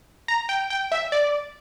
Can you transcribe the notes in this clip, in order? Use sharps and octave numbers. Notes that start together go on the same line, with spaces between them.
A#5
G5
G5
E5
D5